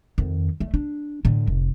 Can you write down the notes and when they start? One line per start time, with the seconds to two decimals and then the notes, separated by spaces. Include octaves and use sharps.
0.18 F2 D#3
0.60 A3
0.74 D4
1.25 A2 D3
1.47 F1